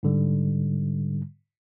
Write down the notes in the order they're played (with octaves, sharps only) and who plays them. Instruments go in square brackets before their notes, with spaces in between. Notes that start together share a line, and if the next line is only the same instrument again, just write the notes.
[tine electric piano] G#2 D3 G3